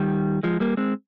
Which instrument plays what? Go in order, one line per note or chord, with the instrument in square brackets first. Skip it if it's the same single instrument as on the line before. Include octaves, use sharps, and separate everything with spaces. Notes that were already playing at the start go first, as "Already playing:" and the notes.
Already playing: [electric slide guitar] D#3 G3
F3 G#3
G3 A#3
G#3 C4